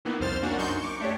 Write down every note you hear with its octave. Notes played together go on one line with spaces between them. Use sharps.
D#3 E3 A#3 B3
C2 F2 C5 F6 A6
A#3 C#4 D4 F#4
F#2 D#4 C6 C#6 G6
C#6 D6
A3 D4 G4 C#5